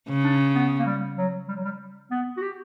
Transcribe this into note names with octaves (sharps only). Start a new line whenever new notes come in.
C#3
D4
B3
A#3
G3
F#3
G3
F#3
G3
B3
F#4
G4